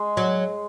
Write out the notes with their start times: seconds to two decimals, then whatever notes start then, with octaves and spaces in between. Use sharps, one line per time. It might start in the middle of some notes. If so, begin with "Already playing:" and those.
Already playing: G#3
0.17 F#3